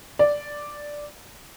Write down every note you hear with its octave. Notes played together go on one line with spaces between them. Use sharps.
D5